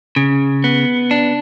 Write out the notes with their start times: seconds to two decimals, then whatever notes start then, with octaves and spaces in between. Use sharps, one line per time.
0.16 C#3
0.64 B3
1.11 D4